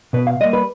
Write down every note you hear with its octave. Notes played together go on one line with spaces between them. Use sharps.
B2 B4
F5
G3 A#3 D#5
B4